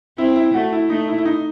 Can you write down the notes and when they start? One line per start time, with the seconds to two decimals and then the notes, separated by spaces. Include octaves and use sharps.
0.18 C4 E4
0.36 E4
0.54 A3 F#4
0.73 E4
0.90 A3 D#4
1.08 E4
1.18 E4
1.25 D#4